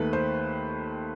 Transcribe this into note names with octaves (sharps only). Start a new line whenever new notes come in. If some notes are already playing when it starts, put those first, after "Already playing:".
Already playing: D#2 D#3 A3 B4
C5